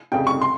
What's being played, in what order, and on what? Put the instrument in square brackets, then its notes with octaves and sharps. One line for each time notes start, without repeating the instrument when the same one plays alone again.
[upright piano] F1 F2 C#3 G5
C#6
C6